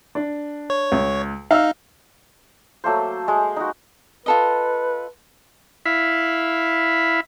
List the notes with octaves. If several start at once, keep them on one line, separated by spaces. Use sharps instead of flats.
D4
C#5
C#2
D#4 F5 E6 F6
F#3 A3 A#3 C5
G#3
D#4 F#4
F4 A4 B4 D#5
E4 E5 F5 B5